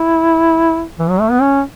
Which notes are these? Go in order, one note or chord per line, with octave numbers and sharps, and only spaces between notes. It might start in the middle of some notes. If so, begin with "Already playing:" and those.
Already playing: E4
E3
F#3
A3
B3
C#4